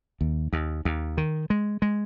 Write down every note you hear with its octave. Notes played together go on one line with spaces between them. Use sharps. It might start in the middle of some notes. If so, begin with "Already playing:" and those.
D#2
D#2
D#2
D#3
G#3
G#3